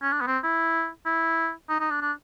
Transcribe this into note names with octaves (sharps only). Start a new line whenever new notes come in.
C#4
D4
B3
C4
E4
E4
D#4
D#4
D4
D4